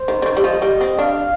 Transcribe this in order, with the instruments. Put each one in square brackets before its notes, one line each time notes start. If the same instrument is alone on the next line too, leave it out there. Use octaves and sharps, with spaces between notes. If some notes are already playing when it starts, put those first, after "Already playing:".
Already playing: [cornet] C5
[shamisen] D#3
D3
D#3
G3
[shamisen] F3 [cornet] D#5
[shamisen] G3
C4
[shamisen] D4 [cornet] F5